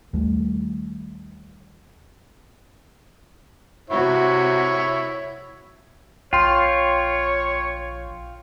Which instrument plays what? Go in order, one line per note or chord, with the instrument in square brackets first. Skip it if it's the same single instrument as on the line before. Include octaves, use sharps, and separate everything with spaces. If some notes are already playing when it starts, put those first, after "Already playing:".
[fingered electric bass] D#2 G3 A3
[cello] C3 F#4 [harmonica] E4 C#5
[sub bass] A#1 [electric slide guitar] F4 [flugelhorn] C#5 [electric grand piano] G5 C6